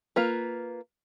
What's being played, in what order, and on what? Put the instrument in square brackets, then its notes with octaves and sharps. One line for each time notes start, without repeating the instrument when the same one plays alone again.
[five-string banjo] A#3 F4 B4